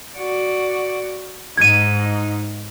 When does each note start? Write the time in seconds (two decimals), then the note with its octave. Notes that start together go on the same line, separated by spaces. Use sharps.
0.16 F#4 D5
1.58 G#2 D#4 G#6 D#7